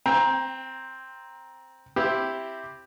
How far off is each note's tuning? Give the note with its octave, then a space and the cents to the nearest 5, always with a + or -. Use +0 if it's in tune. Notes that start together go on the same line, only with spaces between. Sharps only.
C4 +0 G5 +30 A#5 +15
C4 +0 E4 +0 G4 +0